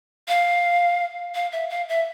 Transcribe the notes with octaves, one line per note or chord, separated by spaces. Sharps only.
F5
F5
E5
F5
E5